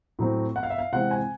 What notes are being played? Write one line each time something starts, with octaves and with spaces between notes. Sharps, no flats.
A2 F#3 A3 C4
F#5
F5
E5
F5
C3 E3 G#3 C4 F#5
G#5